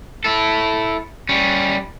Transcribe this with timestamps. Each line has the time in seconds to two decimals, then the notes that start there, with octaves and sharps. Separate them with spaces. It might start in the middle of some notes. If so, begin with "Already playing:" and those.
0.24 E4 A4
1.29 G3 C#4